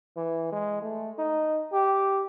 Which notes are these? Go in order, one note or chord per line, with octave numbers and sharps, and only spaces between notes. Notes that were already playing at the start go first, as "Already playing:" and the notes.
E3
G#3
A3
D#4
G4